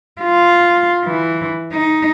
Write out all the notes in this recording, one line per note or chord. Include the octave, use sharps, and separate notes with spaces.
F4
E3
D#4